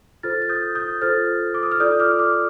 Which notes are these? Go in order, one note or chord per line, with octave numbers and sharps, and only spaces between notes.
F4 A4 C5 F6 A6
A6
D#6 G6
D#6 G6
F4 A4 C5 F6 A6
D6
D#6
F6
F4 A4 D5 D#6 G6
D6 F6
D6 F6